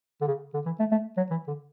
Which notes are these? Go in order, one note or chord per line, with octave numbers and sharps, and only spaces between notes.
D3
C#3
D3
E3
A3
A3
F#3
E3
D3